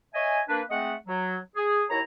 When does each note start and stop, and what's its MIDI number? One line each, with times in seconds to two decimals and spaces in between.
0.15 0.41 73
0.15 0.41 75
0.15 0.41 76
0.15 0.41 80
0.49 0.62 58
0.49 0.62 62
0.49 0.62 71
0.70 0.93 56
0.70 0.93 57
0.70 0.93 60
0.70 0.93 75
0.70 0.93 78
1.07 1.38 54
1.56 1.84 68
1.90 2.01 39
1.90 2.01 64
1.90 2.01 73
1.90 2.01 82